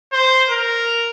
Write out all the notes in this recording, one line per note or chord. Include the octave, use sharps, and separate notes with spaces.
C5
A#4